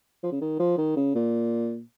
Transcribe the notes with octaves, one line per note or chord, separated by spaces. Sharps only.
F3
C#3
D#3
F3
D#3
C#3
A#2